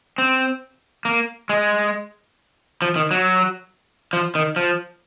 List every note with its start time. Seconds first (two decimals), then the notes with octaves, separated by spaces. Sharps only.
0.18 C4
1.05 A#3
1.50 G#3
2.82 F3
2.96 D#3
3.11 F#3
4.13 F3
4.35 D#3
4.56 F3